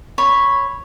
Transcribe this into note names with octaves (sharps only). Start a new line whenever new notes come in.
C#5 B5